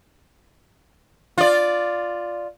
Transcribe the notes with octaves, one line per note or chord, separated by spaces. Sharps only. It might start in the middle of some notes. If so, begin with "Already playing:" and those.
F4 D5